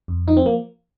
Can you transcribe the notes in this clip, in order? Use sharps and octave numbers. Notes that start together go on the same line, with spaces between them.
F2
F3 D#4
C4
A#3